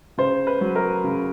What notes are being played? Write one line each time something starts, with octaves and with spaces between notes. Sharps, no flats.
C#3 C5
B4
F#3
A#4
C#3